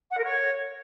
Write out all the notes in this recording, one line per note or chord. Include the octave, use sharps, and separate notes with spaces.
F#5
A#4
C#5